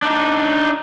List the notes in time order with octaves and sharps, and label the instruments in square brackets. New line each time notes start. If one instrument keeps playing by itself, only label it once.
[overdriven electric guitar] D4 D#4